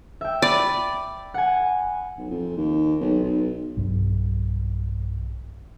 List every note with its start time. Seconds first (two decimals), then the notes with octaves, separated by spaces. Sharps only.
0.21 E5 G5
0.42 D5 B5 D#7
1.34 F#5 G#5
2.18 B1
2.30 F2
2.57 D#2
3.01 B1
3.23 B1
3.77 B1 G2